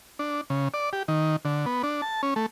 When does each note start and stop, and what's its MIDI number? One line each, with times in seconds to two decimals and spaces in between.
0.19 0.41 62
0.50 0.68 49
0.74 0.90 74
0.93 1.03 67
1.08 1.36 51
1.45 1.66 50
1.66 1.82 59
1.83 2.01 62
2.02 2.22 81
2.23 2.34 61
2.36 2.46 57